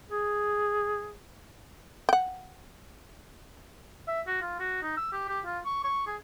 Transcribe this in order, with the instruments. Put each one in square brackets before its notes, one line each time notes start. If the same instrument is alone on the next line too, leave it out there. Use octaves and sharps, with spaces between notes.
[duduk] G#4
[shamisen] F#5 G5
[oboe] E5
F#4
F4
F#4
D#4
E6
G4
G4
F4
C#6
C#6
G#4